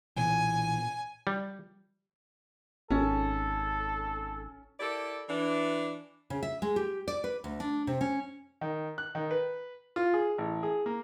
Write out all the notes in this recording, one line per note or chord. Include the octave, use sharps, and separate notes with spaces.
B1 A#2 E3 B3 G#5
G3
G#1 C#4 A4
E4 G4 A4 A#4 D5
E3 D4
C#3
E5
G#3
G4
D5
B4
D2
D4
C3
C#4
D#3
F#6
D#3
B4
F4
G#4
A1
G#4
A#3